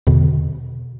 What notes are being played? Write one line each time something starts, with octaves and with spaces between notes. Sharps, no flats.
E2 B2 D3